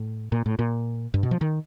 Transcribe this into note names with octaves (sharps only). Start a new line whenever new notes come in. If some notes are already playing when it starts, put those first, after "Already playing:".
Already playing: A2
A#2
A2
A#2
G2
B2
F3
D#3